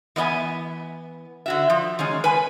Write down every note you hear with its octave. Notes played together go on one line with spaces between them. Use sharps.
E3 B3 D#5 E5 G#5
D3 F#4 E5
F3
D#3 G#3 C#4
B4 G#5